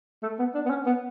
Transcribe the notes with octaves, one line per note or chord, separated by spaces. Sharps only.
A3
B3
D4
B3
C#4
B3